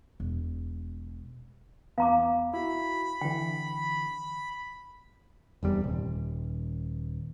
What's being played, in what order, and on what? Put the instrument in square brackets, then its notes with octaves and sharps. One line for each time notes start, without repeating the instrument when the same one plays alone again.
[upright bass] E1
[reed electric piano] E2 B3 [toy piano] F5 A#5 D6
[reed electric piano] E4 F#4 [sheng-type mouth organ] B5
[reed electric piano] D3 E3 [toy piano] G5
[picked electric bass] F1 E2 G3
D#1